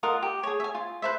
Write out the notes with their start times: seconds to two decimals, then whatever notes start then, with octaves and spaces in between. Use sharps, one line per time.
0.03 F4 A#4 D#5 F#5
0.22 G4
0.43 G#4 C#5
0.60 E5 G#5
0.75 F4
1.02 B4 C5 E5